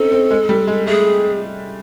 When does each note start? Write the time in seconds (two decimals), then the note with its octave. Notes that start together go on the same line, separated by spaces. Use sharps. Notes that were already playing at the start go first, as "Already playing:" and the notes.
Already playing: C4 C#4 D#4 A4
0.12 C4
0.31 G#3
0.49 G3
0.67 G#3
0.87 A3 G#4